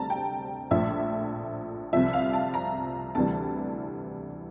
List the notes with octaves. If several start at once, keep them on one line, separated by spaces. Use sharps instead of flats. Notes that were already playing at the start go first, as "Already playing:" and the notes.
Already playing: D2 C3 G3 A5 A#5
G5
A#1 A2 F3 E5
C2 C3 F3 E5
F5
A5
A#5
D2 C3 E3 G3 A5